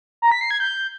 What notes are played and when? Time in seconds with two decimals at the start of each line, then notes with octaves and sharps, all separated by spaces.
0.22 A#5
0.32 B6
0.41 C7
0.51 G#6
0.60 G6